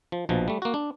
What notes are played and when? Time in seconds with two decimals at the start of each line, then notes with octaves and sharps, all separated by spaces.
0.12 F3
0.29 A#1 B2 F3
0.48 G3 A3
0.62 A#3 F#4
0.74 D4